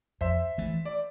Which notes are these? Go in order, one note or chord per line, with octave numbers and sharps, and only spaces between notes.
F2 C5 E5
E3 A3
D5